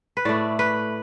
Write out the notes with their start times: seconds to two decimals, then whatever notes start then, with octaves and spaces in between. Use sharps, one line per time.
0.17 B4
0.25 A2 A3 D5
0.59 B4